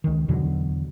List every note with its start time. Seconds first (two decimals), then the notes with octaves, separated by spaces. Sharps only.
0.04 C#2 D#3
0.28 E2 B2 D3 F#3